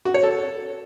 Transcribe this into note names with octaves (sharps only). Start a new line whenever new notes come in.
F#4
C#5
A4